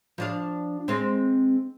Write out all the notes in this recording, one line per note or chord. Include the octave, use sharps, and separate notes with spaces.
F3 D4 F5
G#3 C4